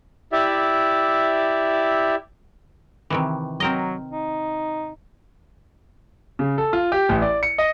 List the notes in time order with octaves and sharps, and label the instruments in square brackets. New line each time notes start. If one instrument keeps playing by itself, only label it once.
[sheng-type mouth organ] E4 G4 D5 E5
[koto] C3 D#3 E3
[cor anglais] F#3 [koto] C4 A#4 D#5
[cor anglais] D#4
[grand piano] C#3
A4
F4
G4
A1
D5
C#7
D#5